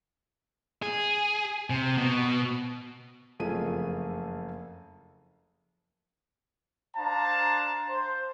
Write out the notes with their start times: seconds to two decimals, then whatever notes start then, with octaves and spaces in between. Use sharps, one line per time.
0.82 G#4
1.70 C3
1.98 B2
3.40 F#1 F2 A3 F4 G#4 D#7
6.97 D4 C5 F5 A5 A#5
7.89 C5